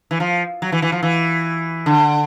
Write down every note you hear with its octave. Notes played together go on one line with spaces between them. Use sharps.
E3
F3
F#3
E3
E3
F3
E3
D3